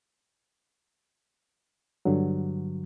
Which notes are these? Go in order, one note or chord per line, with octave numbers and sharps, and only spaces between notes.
G2 D3 F#3